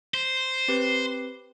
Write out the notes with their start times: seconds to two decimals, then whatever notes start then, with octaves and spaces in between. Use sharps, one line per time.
0.14 C5
0.68 C4 G4 B4